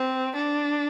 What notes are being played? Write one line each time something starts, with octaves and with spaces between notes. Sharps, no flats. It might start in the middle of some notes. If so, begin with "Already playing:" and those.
Already playing: C4
D4